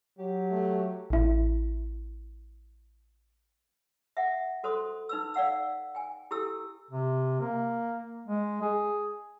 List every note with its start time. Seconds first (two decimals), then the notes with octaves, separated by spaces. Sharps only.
0.18 F#3 G4
0.51 A3
1.10 A1 E4
4.17 E5 F#5
4.63 F#4 A4 C5 C6 D#6
5.09 D#4 B4 E6
5.34 D5 F5 F#5 E6
5.95 G5 G#5
6.31 E4 G4 A4 E6
6.90 C3
7.40 A#3
8.26 G#3
8.62 G#4